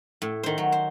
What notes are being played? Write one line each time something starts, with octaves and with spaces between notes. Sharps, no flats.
A2
D#3 C5
F#3
C5